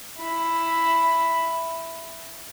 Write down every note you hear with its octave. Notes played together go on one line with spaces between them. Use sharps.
E4